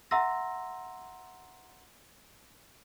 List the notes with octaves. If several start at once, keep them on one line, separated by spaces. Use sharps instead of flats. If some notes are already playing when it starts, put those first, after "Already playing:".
E5 F#5 A#5 C6 E6 A#6